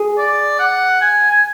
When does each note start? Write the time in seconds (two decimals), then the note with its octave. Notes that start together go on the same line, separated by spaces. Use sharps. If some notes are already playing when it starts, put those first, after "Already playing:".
Already playing: G#4
0.18 D5
0.59 F#5
1.01 G#5
1.31 G#5